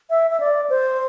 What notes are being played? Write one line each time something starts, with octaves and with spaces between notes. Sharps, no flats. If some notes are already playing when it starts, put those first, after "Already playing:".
E5
E5
D5
C5